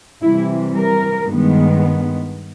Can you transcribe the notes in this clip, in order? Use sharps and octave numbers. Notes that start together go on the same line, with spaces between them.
C3 E3 G3 E4
A#4
G2 D#3 G#3 B3